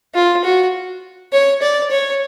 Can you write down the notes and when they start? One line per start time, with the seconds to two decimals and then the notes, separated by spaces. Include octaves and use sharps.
0.15 F4
0.44 F#4
1.33 C#5
1.62 D5
1.91 C#5